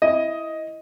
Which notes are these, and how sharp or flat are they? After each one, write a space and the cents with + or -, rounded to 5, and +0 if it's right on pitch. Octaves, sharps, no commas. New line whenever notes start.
E4 +0 D#5 +10